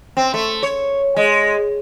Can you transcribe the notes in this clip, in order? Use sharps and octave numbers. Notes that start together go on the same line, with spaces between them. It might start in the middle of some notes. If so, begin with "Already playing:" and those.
C4
A3
C#5
G#3